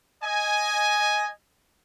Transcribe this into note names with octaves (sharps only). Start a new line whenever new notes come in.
D#5 G#5